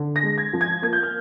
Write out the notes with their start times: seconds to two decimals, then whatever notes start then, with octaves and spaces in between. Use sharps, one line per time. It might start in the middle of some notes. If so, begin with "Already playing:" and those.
Already playing: D3
0.16 A#6
0.23 G#3
0.38 G#6
0.53 F3
0.61 G#6
0.82 A#3 G#6
0.93 G6
1.03 F6